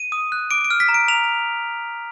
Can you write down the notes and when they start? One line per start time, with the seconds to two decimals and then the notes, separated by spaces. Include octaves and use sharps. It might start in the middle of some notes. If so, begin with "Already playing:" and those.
Already playing: D#7
0.12 D#6
0.32 F#6
0.51 D6 D7
0.65 D7
0.71 F6
0.80 B6
0.89 A#5
0.94 D7
1.08 A#5 F7